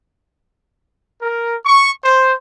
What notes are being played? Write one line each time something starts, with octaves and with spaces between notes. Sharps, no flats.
A#4
C#6
C5